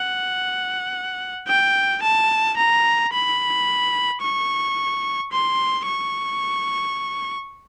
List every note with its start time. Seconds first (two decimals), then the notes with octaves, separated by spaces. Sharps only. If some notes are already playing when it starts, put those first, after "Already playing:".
Already playing: F#5
1.47 G5
2.02 A5
2.57 A#5
3.13 B5
4.22 C#6
5.32 C6
5.86 C#6